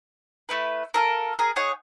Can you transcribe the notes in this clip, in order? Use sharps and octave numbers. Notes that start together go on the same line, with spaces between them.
A3 E4 B4
F4 A4 A#4
G#4 A#4
D#4 G#4 C#5 F#5